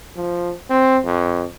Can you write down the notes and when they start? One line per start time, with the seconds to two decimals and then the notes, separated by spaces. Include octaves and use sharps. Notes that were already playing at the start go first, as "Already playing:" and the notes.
0.16 F3
0.70 C4
1.04 F2